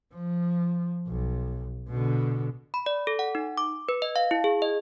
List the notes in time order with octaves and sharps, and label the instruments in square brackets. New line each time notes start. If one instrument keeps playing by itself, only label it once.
[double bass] F3
B1
B2 D3
[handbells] B5
D5
A4
F#5
D#4
D6
B4
D#5
F5
E4
G#4
D#5